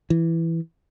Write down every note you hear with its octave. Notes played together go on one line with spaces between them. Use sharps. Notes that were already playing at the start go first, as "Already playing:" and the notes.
E3